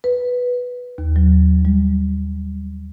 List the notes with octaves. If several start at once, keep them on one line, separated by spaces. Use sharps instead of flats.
B4
D#2
F#3
G3